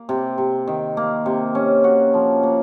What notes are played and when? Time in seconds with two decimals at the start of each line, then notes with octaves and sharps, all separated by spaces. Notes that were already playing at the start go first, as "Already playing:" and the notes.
Already playing: A#3
0.09 C3
0.38 C3
0.67 D#3
0.97 A#3
1.26 C3
1.55 C#4
1.84 F#4
2.14 F3
2.43 A#3